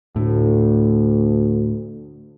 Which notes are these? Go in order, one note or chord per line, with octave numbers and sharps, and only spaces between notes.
D2 A2